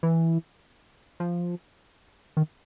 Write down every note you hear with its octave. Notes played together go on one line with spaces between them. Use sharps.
E3
F3
D#3